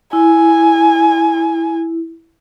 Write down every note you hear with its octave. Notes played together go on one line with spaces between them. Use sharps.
E4 G#5